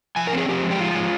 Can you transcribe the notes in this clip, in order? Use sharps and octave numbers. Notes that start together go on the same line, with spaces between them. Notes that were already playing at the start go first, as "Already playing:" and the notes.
F3 G#5
A#4
C4 G#4
F3 G4
G#3
G4
F3 F4
G#3